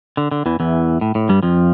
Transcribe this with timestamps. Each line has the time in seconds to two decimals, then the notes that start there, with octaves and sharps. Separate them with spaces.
0.17 D3
0.31 D3
0.46 E2 E3
0.60 E2 E3
1.01 A2
1.15 A2
1.29 G2 G3
1.43 F2 F3